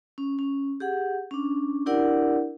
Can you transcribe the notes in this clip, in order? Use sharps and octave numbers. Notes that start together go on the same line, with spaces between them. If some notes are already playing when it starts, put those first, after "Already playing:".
C#4
C#4
G4 G#4 F#5
C#4 D4
D4 E4 G4 A#4 D5 F#5